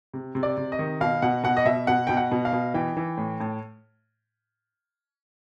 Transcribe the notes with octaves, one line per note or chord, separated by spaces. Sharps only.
C3
C3
D5
C3
D#5
D#3
B2 F5
B2 F#5
B2 F#5
D#5
B2 E5
B2 F#5
B2 G5
F#5
B2
F5
B2
E3 G5
E3
A2
A2